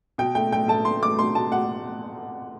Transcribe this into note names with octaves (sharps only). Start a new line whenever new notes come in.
B2 G5
A3 G5
A3 G5
A3 A5
A3 C6
A3 D6
B2 C6
B2 A5
B2 F#5